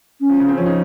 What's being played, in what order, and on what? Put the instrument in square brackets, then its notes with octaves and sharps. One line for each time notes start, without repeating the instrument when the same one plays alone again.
[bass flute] C#4
[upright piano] F3
C#3
C4
[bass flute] F3 [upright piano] C#4
[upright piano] D#4